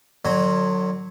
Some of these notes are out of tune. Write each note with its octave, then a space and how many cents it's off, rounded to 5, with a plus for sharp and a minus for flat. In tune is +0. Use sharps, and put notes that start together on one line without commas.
D3 +40 F#3 +0